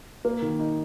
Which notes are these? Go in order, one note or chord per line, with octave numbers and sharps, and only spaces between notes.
A#3
D#3
D#4